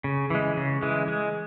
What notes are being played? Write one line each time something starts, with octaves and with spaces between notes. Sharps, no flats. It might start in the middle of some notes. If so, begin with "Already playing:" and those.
C#3
E3 G#3
C#3
E3 G#3
G#3